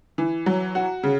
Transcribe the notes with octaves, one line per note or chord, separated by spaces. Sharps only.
E3
F#3
F#4
C#3